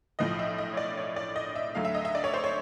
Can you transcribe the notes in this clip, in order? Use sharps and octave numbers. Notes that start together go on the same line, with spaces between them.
B1 A2 F3 D#5
E5
D#5
C#5
D5
C#5
D5
D#5
E5
D2 D3 F#3 A3 F5
E5
D#5
E5
D5
C#5
C5
C#5